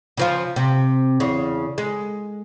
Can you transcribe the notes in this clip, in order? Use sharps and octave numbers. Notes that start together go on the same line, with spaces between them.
C#3 F3 F4
C3
E2 C#3
G#3